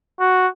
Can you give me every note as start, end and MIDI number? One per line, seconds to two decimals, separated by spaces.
0.20 0.47 66